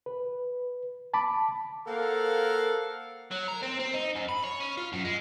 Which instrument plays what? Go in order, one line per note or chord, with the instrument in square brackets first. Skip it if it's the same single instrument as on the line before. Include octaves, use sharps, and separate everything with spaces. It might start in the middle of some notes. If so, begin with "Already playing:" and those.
[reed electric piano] B4
A5 B5 D6
[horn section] A#3 A4 A#4 C5 F5 F#5
[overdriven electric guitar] F#3
A#4
C4
C4
D#4
F#2
B5
C#5
C#4
F4
F#2
G#3